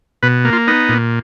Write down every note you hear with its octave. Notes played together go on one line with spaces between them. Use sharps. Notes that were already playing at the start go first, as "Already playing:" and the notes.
B2 B4
A#3
F4
B3 D#4
A#2